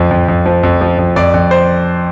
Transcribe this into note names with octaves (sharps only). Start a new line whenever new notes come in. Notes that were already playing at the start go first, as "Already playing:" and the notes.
Already playing: F2 F3
F2
F2
F3
F2
F3
F2
F2 D5
F2
C5